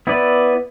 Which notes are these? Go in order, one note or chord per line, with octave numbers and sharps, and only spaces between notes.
B3 E4 B4 D5